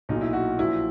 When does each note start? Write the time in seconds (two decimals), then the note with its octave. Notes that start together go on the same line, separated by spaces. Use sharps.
0.09 B1 A#2 F#3 D#4
0.21 E4
0.33 F#4
0.58 A#1 A#2 F#3 E4